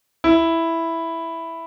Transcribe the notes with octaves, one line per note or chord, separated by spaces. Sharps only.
E4